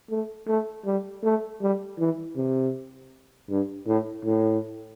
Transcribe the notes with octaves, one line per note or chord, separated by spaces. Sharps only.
A3
A3
G3
A3
G3
E3
C3
G2
A2
A2